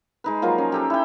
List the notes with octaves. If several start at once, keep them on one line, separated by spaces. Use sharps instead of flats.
G#3 D#4 B4
F3 F#3 A#3 F4
C#4
G4 A4 A#5
E4 G5